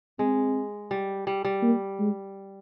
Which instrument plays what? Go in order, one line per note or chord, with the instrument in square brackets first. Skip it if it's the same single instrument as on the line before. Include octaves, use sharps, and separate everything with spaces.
[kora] G#3 [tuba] C4
[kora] G3
G3
G3
[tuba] A#3
G#3